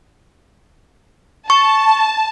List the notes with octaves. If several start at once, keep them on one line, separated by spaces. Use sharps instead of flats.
A5 C#6